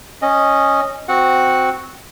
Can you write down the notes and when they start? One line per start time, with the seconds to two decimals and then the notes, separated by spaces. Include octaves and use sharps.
0.22 C#4 D#5
1.08 C4 F#4 F#5